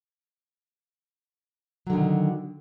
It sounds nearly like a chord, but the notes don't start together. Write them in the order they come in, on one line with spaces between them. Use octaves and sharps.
F#3 D3 D#3